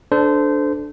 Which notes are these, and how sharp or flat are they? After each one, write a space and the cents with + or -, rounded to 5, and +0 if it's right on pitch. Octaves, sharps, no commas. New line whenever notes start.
D4 +0 A4 -15 C5 -25